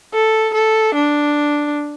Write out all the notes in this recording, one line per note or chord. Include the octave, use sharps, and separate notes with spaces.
A4
A4
D4